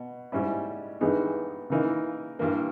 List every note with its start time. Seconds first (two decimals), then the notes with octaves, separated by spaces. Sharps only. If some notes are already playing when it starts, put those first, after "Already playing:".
Already playing: B2
0.32 G#2 G3 C#4 E4
1.01 G2 E3 G#3 B3 D#4
1.70 C#3 E3 A#3 D#4
2.39 G2 E3 A#3